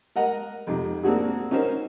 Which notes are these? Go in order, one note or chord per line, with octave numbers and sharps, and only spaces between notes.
A#4 D#5 F#5 A#5
F2 C3 D#4
A#3 C4 D4 F#4 G#4
C#4 D#4 F#4 A#4 C5